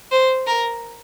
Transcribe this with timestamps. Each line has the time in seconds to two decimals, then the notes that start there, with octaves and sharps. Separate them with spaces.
0.12 C5
0.47 A#4